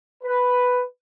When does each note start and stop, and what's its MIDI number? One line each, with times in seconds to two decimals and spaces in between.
0.23 0.82 71